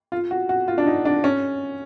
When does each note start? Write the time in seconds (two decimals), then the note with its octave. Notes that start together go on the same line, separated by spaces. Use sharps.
0.12 F4
0.31 F#4
0.49 F#4
0.68 F4
0.78 D4
0.86 D#4
1.05 D4
1.24 C#4